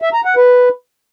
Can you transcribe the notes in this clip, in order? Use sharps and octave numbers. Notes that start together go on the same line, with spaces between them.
E5
A#5
F#5
B4